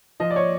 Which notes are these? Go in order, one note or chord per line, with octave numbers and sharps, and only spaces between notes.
F3 D#5
D5
C#5